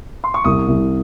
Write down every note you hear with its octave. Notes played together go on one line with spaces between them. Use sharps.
C6
C#6
C2 D#6
C2